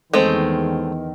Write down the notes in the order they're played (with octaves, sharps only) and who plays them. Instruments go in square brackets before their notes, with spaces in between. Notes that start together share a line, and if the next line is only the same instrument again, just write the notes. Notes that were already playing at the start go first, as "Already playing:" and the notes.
[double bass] E2 D#3 [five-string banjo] G#3 A3 C4